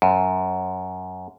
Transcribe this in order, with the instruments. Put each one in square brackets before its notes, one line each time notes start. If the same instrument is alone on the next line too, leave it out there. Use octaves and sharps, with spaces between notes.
[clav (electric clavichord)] F#2